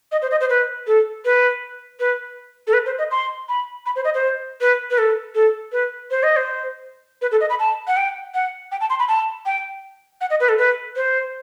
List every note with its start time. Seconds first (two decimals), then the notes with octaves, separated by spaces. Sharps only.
0.12 D#5
0.22 C5
0.31 D#5
0.41 C5
0.50 B4
0.87 A4
1.25 B4
2.00 B4
2.67 A4
2.73 B4
2.86 C5
2.98 D#5
3.11 C6
3.49 B5
3.86 B5
3.96 C5
4.05 D#5
4.15 C5
4.61 B4
4.91 B4
4.98 A4
5.35 A4
5.72 B4
6.11 C5
6.23 D#5
6.36 C5
7.22 B4
7.32 A4
7.41 D#5
7.50 B5
7.59 A5
7.87 F#5
7.97 G5
8.34 F#5
8.72 G5
8.81 A5
8.90 C6
9.00 B5
9.08 A5
9.46 G5
10.21 F#5
10.30 D#5
10.40 B4
10.49 A4
10.58 B4
10.96 C5